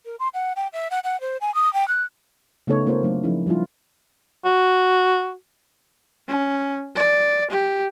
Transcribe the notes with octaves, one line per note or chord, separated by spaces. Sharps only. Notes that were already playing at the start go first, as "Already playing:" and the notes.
A#4
C6
F#5
G5
E5
F#5
F#5
C5
G#5
D#6
G5
F#6
C#3 A3 B3 D#4 A4 C#5
G#3 A#3 C4 F4 C5 C#5
F#3 A3 D4
F3 C#4 D#4 E4
F3 G3 D4 E4 F4
F#4
C#4
D5
G4